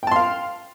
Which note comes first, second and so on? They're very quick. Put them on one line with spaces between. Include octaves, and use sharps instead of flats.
G5 A5 C6 F5